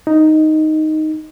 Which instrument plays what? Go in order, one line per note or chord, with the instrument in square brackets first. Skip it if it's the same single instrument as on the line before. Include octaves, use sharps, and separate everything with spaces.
[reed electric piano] D#4